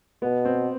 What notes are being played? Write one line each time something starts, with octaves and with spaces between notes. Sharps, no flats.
B2 B3
C4